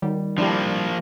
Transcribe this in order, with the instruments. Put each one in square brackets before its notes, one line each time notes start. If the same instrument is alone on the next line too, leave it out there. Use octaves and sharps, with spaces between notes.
[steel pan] D#3 [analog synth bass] G3
[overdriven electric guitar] F3 A#3 [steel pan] D4 E4 G4